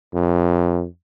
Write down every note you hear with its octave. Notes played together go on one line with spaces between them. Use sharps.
F2